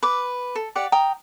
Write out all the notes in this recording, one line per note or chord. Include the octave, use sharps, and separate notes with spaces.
B4 D6
A4
G4 D5 F#5
G5 A#5 D#6